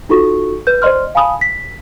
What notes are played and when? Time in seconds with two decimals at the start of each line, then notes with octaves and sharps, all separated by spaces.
0.09 D#4 F4 F#4 A4 C#6
0.67 B4 G6
0.82 C5 D5 D#5 C6 F6
1.15 F5 G#5 A5 B5 D#6
1.41 B6